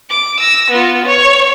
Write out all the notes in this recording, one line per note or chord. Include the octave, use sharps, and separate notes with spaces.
D6
E6 A#6
B3 F4
C#5